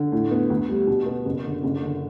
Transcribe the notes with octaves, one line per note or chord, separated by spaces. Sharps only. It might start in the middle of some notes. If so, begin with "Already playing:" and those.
Already playing: D3
A2
B3
D2
G3
B2
B3
F#1
D3
F#1
D3